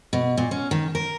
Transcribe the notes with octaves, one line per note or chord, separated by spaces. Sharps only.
B2
A#2
C#4
D#3
A#4